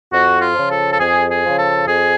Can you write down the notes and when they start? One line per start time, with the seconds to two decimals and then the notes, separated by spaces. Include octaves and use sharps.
0.12 F2 F#4
0.41 F4
0.56 C#3 F3
0.71 A4
0.93 A4
1.00 F2 G#4
1.29 G#4
1.43 C#3 F3
1.58 A4
1.88 F2 G#4